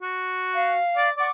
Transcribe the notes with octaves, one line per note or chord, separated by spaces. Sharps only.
F#4
F5
D5
D5 F#5 C#6 D6